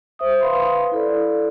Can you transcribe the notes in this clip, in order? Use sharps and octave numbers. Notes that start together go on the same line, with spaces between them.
C5 E5 D#6
B4 F5 B5 C6
E4 A4 D5